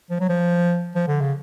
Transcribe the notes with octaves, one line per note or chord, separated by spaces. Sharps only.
F3
F#3
F3
F3
D3
C#3